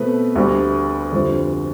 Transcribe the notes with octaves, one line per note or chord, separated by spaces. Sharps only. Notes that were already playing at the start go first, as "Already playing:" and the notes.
Already playing: B2 A3 C4 B4
D2 D3 G3
F2 D3 G3